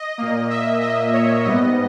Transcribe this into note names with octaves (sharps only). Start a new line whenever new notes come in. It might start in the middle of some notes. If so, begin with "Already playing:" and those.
Already playing: D#5
A#2 A#3
E5
D#5
C#5
G#2 G3 B3 D#5